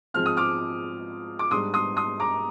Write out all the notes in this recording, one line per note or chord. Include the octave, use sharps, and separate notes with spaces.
G#2 F3 G#3 C4 F6
D#6
D6 F6
D6
G#2 G3 D4 C6 D#6
C6 D#6
C6 D#6
A#5 D6